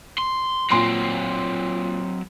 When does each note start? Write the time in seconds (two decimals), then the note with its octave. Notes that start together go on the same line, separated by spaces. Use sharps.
0.18 C6
0.70 A#2 F#3 C4 C6 C7